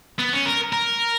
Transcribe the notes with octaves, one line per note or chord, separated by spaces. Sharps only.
B3
C#4
A#4
A#4